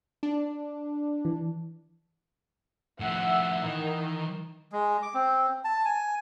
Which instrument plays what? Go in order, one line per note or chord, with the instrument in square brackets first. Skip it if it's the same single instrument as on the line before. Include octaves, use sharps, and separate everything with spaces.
[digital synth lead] D4
[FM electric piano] E3
[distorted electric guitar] A2 F3 [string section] E5 F#5
[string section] D#3 [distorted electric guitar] E3
[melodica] G#3
D6
C4
A5
G#5